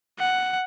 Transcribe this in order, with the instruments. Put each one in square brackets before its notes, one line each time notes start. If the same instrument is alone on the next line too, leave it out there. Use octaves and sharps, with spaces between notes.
[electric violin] F#5